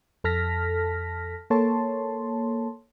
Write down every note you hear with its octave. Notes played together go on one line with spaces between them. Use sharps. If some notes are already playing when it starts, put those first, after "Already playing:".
F2 A4 A5 F6 A#6 B6
A#3 A4 C#5 A5 C6